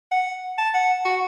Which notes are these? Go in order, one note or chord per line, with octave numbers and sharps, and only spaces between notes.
F#5
A5
F#5
F#4